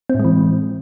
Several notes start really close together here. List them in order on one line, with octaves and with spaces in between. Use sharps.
C4 A2 G#3 E3